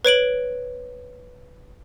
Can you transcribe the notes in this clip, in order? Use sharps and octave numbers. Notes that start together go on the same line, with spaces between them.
B4 C#5 D7 F#7